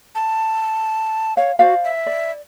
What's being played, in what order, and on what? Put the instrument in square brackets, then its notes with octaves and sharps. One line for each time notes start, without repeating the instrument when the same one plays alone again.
[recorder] A5
[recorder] C#5 [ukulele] F5
[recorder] F#4 [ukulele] C5 D5 F5
[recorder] E5
[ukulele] D5